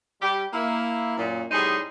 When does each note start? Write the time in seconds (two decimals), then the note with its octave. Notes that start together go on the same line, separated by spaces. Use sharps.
0.21 G3 G4
0.53 A#3 E4
1.17 F#2 A#2
1.51 A2 C3 G3 D#4 G#4 C6